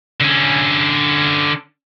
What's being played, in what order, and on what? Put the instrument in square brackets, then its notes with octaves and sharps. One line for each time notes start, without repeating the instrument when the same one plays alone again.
[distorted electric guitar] D3 C#4